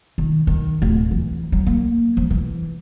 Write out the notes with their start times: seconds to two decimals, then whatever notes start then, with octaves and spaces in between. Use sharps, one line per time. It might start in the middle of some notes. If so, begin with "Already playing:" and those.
0.18 D#3
0.47 D#3
0.82 D1
1.11 E3
1.52 F#3
1.67 A#3
2.17 F3
2.30 E3